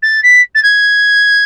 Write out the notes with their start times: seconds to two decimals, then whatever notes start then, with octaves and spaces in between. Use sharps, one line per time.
0.02 A6
0.23 B6
0.54 A6
0.63 G#6